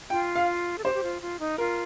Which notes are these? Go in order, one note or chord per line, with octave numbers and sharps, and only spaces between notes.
F4 G5
F5
A4
G4 C5
G4
F4
F4
D#4
F4 A#4